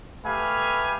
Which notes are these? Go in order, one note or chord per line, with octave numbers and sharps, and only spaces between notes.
A3 G4 B4 F5 G#5 B5